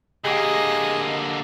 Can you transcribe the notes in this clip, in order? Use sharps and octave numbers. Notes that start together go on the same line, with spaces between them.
D3 A#3 G4 G#4 D#5